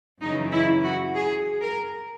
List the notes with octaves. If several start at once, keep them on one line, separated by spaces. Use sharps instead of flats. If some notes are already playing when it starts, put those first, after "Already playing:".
F#2 C#3 E3 D#4
E4
F#4
G#4
A#4